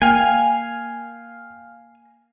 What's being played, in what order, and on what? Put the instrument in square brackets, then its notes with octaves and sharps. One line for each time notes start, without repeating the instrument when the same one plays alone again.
[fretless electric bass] A#3 [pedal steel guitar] F5 G#5 [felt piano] G5